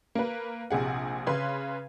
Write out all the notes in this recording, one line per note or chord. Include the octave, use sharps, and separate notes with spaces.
A#3 B4
A#1 C3 G#4 F#5
C#3 B4 C6 G#6